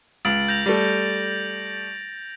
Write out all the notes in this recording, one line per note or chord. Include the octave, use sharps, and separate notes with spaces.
C#2 A6 D7 F#7
G6 A#6 F7
G3 A3